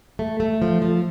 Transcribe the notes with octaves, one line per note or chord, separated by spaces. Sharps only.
A3
A3
F3
F3